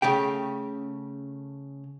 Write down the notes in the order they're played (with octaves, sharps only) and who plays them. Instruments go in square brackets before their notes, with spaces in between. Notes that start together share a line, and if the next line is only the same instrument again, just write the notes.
[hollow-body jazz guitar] C#3 A3 G4 G5